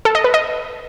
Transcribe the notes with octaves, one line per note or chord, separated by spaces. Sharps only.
A4
D#5
B4
D#5